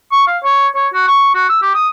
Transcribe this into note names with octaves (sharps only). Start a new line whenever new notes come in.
C#6
F5
C#5
C#5
F#4
C#6
F#4
E6
G4
D#6